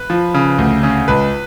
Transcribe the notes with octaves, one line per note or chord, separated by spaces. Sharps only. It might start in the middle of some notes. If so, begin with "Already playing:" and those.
Already playing: B4
F3
C#3
D2
C#3
C#2 B4